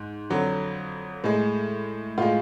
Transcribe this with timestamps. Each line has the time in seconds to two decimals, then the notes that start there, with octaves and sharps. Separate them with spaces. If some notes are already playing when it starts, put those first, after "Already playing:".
Already playing: G#2
0.30 F2 D3 F#3
1.24 A2 G#3
2.18 A2 G#3 F4